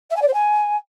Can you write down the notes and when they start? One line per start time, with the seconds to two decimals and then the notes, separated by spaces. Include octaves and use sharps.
0.10 E5
0.16 G#5
0.21 D5
0.27 C5
0.33 G#5